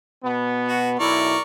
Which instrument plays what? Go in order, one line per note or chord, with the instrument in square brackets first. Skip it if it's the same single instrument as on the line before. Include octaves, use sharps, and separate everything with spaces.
[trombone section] B2 B3
[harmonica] F#4
[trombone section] B1 E4 [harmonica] A#4 D5 C#6